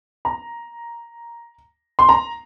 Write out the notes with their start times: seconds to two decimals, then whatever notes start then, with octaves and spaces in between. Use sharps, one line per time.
0.25 A#5
1.99 C6
2.09 A#5